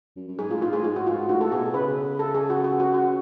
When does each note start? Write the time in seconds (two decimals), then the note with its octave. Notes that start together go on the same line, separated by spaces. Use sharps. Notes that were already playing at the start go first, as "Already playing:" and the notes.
0.16 F#2
0.28 F#2
0.39 G#2 G#4
0.50 A2 F4
0.62 G#2 F4
0.73 A2 G#4
0.84 G#2 F4
0.96 F#4
1.07 F4
1.29 A2 F#4
1.41 A4
1.52 B2 G#4
1.74 C#3 B4
2.19 A4
2.35 G#4
2.50 F#4
2.64 F#4
2.80 F#4
2.94 F#4